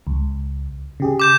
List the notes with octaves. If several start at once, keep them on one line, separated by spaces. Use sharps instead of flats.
C#2
C#3 G4 G#4
D6 G6 E7